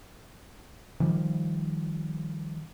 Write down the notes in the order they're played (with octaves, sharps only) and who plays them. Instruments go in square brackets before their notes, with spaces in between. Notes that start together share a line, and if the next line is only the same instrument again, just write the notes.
[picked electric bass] D#3 F3 G3